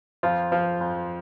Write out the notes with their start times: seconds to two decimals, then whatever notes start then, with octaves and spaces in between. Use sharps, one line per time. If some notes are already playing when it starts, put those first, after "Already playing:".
0.23 F2 F3 F4
0.52 F3 F4
0.81 F2